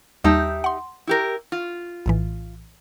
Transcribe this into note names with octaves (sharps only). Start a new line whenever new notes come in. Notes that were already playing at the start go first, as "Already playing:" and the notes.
D#2 G3 D#4 G4 E5 A5
F#5 C6
E4 G4 A#4
F4
A#1 A2 E3